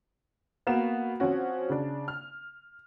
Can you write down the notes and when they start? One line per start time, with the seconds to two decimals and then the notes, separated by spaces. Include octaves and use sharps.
0.67 A#3 B3 F#4 E7
1.20 F3 C4 C#4 F#4
1.69 C#3 D4
2.08 F6